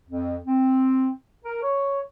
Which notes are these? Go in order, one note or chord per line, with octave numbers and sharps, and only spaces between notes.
F2
C4
A#4
C#5